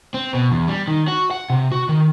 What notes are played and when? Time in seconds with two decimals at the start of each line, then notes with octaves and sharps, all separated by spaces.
0.14 C4
0.34 B2
0.52 E2
0.68 G3
0.88 D#3
1.08 F#4
1.31 F#5
1.50 C3
1.72 F#4
1.89 D#3